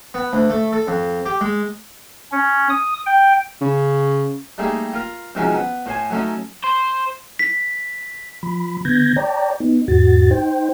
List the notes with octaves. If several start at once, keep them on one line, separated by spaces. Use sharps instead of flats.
B3
D2
A3
A4
F2
G4
G#3
C#4
D#6
G5
C#3
G3 A3 A#3 D#4 G#4
F4 A#4
C3 D#3 F3 F#3 G#3 C#4
B3
A2 C5 G#5
F#3 A3 C#4 D#4
C5
B6
F3 B5
D3 B3 G6 G#6 A#6
C#5 D5 G5 A5 A#5
B3 D#4
E2 G#2 F#4 A6
D#4 C5 G5